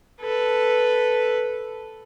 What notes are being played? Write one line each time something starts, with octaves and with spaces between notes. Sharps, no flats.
A4 B4